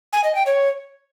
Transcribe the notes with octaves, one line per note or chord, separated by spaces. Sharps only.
G#5
D#5
G5
C#5